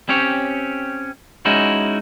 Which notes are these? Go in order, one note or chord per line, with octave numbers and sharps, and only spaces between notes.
C4 C#4 G4 C#5
G#3 C#4 D#4 E4 F#4